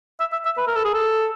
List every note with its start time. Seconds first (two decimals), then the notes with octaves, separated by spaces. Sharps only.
0.20 E5
0.32 E5
0.45 E5
0.58 B4
0.67 A#4
0.75 A4
0.85 G#4
0.94 A4